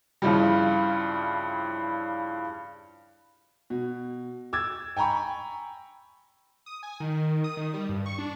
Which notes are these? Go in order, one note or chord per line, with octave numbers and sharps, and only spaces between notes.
G2 C#3 E3 F3 G3
B2
D6 E6 G#6 A6
G5 G#5 A#5 B5 C#6
D#6
G#5
D#3
D#6
D#3
G3
G2
C#6
D4